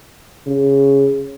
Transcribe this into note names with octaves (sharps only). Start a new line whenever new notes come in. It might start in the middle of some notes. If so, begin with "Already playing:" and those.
C#3